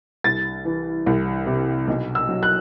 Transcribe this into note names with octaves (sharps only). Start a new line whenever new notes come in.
C2 A6
E3
C2
C3
B1
E6
F#3
F#6